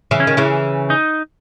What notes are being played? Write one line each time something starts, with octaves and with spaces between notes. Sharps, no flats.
C#3 E3
C#4
D#3
C#3 E3
D#4